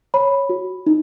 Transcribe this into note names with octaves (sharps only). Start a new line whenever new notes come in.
C#5 B5
F#4
D#4